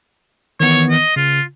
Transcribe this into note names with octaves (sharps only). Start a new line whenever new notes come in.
D#3 E3 B3 C#5
D#5
C#3 F4